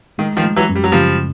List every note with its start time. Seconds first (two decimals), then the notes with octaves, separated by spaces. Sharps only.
0.18 D#3 G#3
0.37 D#3 F3
0.43 G#3
0.56 E3 F#3
0.69 F#2
0.75 G3
0.84 F#3
0.92 C#3 F3 G3